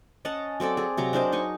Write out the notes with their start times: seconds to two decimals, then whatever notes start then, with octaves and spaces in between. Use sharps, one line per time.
0.25 C#4 D#5 F#5 A5
0.60 F#3 C4 A4 D5
0.77 G#4
0.97 C3 F#3 A#5
1.13 D4 A#4 C5 D#5
1.32 D#4 G#5 C#6